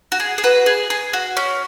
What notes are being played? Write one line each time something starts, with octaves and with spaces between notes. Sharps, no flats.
F#4
G#4
G#4
F#4 B4
G#4
G#4
F#4
C#4